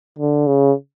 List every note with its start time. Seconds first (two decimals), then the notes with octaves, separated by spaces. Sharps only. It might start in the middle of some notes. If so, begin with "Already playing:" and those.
0.19 D3
0.47 C#3